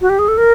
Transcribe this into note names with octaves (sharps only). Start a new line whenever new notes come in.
F#4
G4
G#4
A4
A#4